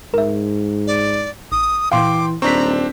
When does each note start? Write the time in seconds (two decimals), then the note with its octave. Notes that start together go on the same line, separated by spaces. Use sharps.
0.14 G#2 A#4 E5
0.87 D5
1.52 A1 D#6
1.92 A#2 E3 F5 G5 C6 D6
2.42 D#1 C4 D4 A#5 C#6 B6